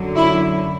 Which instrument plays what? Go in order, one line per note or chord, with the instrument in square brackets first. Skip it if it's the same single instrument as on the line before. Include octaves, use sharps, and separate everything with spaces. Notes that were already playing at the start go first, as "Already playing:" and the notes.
Already playing: [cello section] F#2 D3 F#3
E4